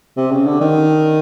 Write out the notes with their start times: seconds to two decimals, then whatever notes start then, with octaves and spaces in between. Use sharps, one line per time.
0.17 C3
0.31 C#3
0.46 D3
0.61 D#3